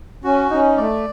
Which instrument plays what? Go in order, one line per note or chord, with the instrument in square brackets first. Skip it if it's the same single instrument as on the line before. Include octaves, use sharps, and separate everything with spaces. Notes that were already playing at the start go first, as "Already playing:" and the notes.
[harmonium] C#4 [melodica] F#4
[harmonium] C#4 [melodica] D#4
[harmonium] A3 [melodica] D5